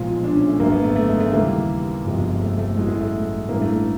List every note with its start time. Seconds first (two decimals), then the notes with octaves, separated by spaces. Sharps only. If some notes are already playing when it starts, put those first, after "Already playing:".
Already playing: B1 A#2 F3 G#3 F4
0.24 D4
0.36 C#4
0.48 A3
0.59 G#1 F#2 D3 F#3 A#3
0.72 B3
0.83 A3
0.96 A3
1.09 G#3
1.20 A3
1.32 D#2 C#3 E3 G3 A#3
2.05 G1 F2 C3 F3 G#3
2.41 A3
2.58 A3
2.77 A1 A2 F#3 G#3
2.89 A3
3.01 A3
3.49 A1 G2 E3 A#3
3.61 A3
3.72 A3